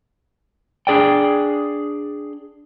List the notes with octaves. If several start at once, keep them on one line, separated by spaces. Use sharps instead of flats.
D4 G#4 D5 G5